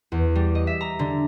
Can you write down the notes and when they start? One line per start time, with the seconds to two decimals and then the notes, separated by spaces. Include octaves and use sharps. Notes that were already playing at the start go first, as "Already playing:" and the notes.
0.12 E2
0.35 G3
0.55 D#5
0.67 E5
0.81 A#5
0.99 D3